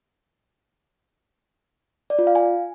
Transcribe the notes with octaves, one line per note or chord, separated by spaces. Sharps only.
D5
F4
F5
G#5